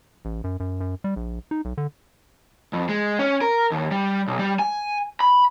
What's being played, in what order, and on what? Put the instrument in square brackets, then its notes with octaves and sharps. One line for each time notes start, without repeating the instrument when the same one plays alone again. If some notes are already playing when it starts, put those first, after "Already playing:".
[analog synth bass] A1
F#2
F#2
F#2
G3
A#1
D#4
B1
D3
[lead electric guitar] F2
G#3
C#4
A#4
D#2
G3
B1
G3
G#5
B5